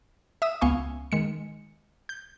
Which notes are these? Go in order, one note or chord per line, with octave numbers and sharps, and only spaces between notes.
E5 D#6 E6
C#2 B3 F5 G#5 C#6
D#3 G#3 C#7
G6